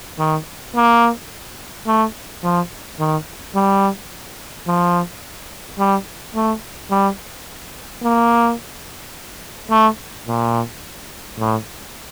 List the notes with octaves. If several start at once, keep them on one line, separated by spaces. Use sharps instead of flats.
D#3
A#3
A3
F3
D#3
G3
F3
G3
A3
G3
A#3
A3
A#2
A2